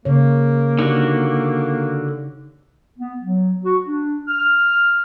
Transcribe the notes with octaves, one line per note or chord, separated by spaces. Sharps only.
C#3 A#3 C#5
D3 D4 D#4 F#4 G4
B3
F#3
F#4
D4
F6